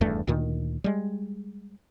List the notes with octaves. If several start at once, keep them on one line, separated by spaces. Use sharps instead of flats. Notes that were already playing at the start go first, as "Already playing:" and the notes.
D#1 E2 G2 A3
D2 A#2 D#3
G3 G#3